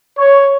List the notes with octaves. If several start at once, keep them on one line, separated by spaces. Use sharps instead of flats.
C#5